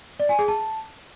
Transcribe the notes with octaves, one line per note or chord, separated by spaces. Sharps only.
D5
G#5
G#4
A5